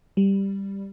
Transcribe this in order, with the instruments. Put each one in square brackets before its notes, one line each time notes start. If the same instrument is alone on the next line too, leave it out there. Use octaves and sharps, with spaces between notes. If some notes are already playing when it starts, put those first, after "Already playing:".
[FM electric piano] G3